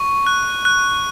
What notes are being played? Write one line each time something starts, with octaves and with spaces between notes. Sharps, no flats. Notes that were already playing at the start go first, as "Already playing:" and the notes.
Already playing: C#6
F#6
F#6